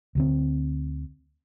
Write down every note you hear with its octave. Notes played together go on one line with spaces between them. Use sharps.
D2 D3 C4